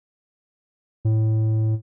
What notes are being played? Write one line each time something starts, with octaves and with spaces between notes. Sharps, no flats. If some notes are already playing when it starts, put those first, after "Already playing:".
A2